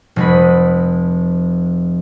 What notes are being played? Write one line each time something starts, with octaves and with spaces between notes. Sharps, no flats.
F1 G#3 B5